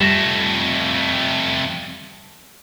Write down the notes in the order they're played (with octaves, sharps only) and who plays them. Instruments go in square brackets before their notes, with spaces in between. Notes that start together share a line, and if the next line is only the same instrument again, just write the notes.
[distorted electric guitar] F2 A3 [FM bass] G3 [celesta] A#6 E7